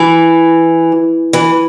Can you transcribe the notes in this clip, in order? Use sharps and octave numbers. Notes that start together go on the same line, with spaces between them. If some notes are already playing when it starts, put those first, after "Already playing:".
Already playing: E3
E3